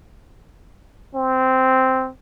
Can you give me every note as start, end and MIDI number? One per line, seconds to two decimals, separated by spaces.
1.15 2.10 60